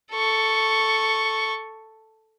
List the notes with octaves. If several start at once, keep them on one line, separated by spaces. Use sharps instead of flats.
A4 C#6